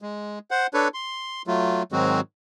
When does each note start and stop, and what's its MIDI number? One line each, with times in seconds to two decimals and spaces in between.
0.02 0.39 56
0.51 0.67 72
0.51 0.67 78
0.74 0.88 62
0.74 0.88 69
0.74 0.88 71
0.74 0.88 73
0.94 1.42 84
1.47 1.83 54
1.47 1.83 57
1.47 1.83 65
1.92 2.21 44
1.92 2.21 51
1.92 2.21 54
1.92 2.21 56
1.92 2.21 60
1.92 2.21 66